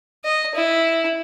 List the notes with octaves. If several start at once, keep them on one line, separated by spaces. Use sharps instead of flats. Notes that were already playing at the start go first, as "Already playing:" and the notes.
D#5
E4